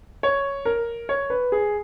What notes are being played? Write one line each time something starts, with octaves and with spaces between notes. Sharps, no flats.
C#5
A#4
C#5
B4
G#4